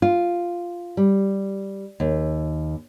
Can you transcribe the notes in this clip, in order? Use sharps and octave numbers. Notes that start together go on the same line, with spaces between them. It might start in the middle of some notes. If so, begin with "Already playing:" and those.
F4
G3
D#2